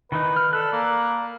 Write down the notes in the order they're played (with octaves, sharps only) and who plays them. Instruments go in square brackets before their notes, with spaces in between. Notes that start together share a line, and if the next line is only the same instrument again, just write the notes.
[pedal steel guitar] D#3 E3 D#4 [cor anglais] B4
[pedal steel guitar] F6
[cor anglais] A4 [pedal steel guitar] D5 B5 F#6
[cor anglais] A#3